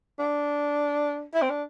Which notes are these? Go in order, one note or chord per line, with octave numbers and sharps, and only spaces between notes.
D4
E4
C4
D4